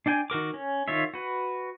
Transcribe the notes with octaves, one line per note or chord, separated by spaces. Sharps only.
D4 D5 G5 G#5
D#3 F#4 A#4 D6
C#4
D#3 F4 C#5 E5
F#4 B4